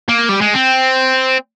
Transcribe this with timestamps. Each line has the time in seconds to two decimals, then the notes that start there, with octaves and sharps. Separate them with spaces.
0.09 A#3
0.29 G3
0.41 G#3
0.54 C4